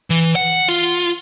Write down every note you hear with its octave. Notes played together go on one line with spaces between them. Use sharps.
E3
F#5
F4